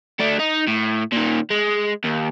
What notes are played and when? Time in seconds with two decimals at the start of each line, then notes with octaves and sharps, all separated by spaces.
0.20 A3 D4
0.40 D#4
0.68 A2
1.12 A#2 D#3
1.50 G#3
2.04 D#2